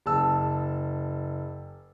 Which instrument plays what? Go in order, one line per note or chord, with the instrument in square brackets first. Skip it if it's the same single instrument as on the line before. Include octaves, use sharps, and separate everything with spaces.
[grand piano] F#1 A5 E6